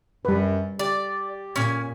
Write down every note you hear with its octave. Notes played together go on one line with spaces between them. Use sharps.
F#2 G3 B4
G4 D5
A#2 C#4 G#5